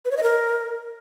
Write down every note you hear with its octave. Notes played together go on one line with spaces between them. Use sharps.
B4
C#5
D#5
A#4